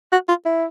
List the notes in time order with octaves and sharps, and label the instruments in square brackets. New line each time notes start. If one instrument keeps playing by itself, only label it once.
[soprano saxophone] F#4
F4
E4